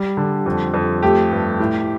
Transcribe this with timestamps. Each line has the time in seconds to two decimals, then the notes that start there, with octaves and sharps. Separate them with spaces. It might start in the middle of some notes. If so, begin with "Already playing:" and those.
Already playing: G3
0.17 D3
0.46 F2
0.74 F2
1.03 A3 G4
1.31 G2
1.60 A2